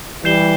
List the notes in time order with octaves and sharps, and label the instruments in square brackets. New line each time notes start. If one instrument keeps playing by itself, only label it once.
[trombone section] E3 G3 [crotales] G6 C7 E7 G7